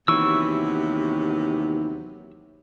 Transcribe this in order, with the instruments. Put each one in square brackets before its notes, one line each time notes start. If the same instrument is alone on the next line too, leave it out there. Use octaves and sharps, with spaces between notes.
[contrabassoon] D#2 [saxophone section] C3 F#3 B3 [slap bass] E3 [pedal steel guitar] C#6 E6